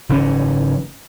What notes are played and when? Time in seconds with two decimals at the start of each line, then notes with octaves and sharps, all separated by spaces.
0.09 F#1 G#2 E3 C#4